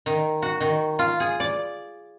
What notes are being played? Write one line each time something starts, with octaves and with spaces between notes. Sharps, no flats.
D#3
F#4
D#3
F4
G#4
D5